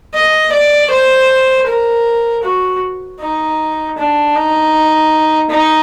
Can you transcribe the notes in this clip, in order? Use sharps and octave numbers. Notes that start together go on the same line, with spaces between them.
D#5
D5
C5
A#4
F#4
D#4
D4
D#4
D#4